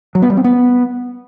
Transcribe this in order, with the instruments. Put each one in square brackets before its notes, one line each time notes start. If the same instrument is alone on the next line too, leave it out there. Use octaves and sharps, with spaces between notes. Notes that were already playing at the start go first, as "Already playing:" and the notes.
[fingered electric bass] F#3
B3
G3
C4
B3